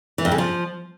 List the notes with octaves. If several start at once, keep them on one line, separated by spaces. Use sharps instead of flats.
E3
F2
C#3
F3